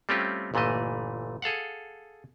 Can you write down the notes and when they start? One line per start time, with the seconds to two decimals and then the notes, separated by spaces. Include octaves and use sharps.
0.09 G3 A3 C4 C#4 F4 G4
0.54 G1 A#2 E3 A3 D#5
1.42 G#4 A4 F5 F#5